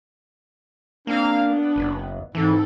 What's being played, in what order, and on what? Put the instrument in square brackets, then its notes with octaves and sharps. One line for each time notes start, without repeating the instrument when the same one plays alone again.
[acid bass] A#3 [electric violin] C4 F5 [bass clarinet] D4
[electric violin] B3
[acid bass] F#1
[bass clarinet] G#2 [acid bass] E3 [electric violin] C4 A4